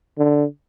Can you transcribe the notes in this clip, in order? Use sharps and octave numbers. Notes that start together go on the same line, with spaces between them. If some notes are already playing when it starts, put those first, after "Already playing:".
D3